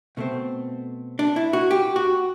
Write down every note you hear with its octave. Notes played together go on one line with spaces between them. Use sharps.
B2 A3 C4
D4
E4
F#4
G4
F#4